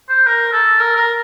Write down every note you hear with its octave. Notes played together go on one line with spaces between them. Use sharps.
C5
A#4
A4
A#4
A#4